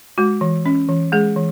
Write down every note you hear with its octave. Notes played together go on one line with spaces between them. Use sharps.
G#3 F#4
E3
C#4
E3
G#3 G#4
E3